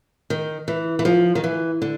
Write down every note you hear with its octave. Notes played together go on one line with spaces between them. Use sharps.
D#3
E3
E3
F3
D#3
E3
D3